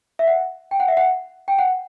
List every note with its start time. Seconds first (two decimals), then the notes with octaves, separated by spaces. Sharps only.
0.19 E5
0.27 F#5
0.71 G5
0.80 F#5
0.88 E5
0.97 F#5
1.48 G5
1.58 F#5